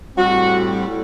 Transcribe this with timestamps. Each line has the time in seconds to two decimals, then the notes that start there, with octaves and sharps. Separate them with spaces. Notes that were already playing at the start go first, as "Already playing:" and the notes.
0.16 A2 G3 C4 F#4
0.86 A2 G3